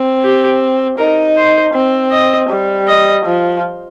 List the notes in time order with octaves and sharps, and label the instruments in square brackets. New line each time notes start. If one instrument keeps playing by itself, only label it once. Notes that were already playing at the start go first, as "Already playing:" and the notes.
Already playing: [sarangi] C4
[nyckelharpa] G4
[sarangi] D#4 [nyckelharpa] A#4
[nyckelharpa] C5
[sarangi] C4
[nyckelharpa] D#5
[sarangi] G3
[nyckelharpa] D#5
[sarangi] F3